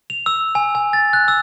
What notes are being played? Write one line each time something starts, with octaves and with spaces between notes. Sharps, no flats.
F7
E6
G#5
G#5
A6
F#6
E6